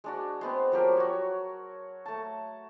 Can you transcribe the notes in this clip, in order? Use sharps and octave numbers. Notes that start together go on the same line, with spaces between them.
G#3 D4 F#4
G#3 B3 C4
F3 F#3 G4 A#4
F#4 C#5
A3 A5